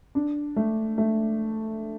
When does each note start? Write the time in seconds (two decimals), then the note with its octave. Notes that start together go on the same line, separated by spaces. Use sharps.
0.15 D4
0.56 A3
0.98 A3